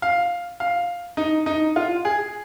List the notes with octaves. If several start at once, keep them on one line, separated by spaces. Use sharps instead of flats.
F5
F5
D#4
D#4
F4
G#4